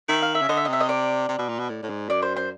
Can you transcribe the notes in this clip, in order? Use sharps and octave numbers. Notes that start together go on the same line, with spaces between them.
D#3 E5
F5
E5
C#3
D3 D#5
E5
D#5
C3 E5
D#5
D5
C3
B2
A#2
B2
A2
A2
G#2
F#2 D5
C5
C5